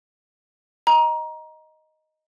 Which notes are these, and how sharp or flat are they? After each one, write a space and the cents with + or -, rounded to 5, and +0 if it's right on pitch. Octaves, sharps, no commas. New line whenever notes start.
D#5 +0 A#5 +20